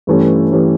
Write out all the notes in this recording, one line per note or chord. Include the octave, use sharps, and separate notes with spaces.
G2 E3 A3 C#4 G4
E3 A3 C#4 G4